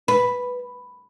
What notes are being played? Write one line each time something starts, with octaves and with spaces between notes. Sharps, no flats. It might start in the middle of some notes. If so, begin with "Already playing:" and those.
B4